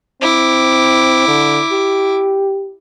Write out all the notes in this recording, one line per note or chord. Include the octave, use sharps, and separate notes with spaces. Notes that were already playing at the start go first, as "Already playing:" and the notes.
C4 E4 D6
D3
G4